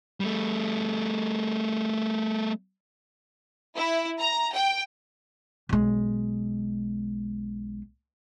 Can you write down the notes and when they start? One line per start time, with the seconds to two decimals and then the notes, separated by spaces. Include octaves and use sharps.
0.20 G3 A3
3.76 E4
4.19 A#5
4.54 G5
5.69 B1 G#3